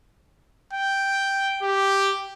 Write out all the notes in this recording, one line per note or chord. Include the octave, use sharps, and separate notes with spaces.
G5
G4